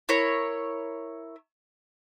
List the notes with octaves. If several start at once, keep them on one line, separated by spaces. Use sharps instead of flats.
E4 A#4 C#5